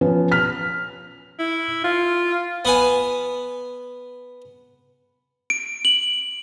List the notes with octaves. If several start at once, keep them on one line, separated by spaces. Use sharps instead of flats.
F3 B3 C#4
F6 B6
E4
F4
B3 B4 G#5
D7
F#7